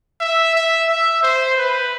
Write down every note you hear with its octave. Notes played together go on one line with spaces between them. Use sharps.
E5
E5
E5
C5
B4